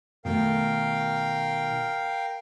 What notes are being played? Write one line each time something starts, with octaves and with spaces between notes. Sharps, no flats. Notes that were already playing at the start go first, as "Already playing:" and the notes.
B2 D#3 A3 A#4 F5 G5